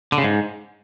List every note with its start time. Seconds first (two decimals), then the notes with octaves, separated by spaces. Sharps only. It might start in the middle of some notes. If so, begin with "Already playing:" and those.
0.12 D3
0.18 C#3
0.24 G#2